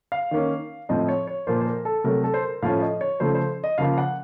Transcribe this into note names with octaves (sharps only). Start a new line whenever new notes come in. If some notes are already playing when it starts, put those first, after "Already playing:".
F5
D#3 A#3 C#4
A2 F3 C4 D#5
C#5
C#5
A#2 F3 A#3 F4 C5
C5
A#4
A4
C3 F#3 A3 A#4
A4
C5
A#4
A2 F3 A3 C#4 F4 F5
D#5
C#5
C#3 F3 A3 C5
C5
D#5
C#3 F3 A#3 F4 F5
F#5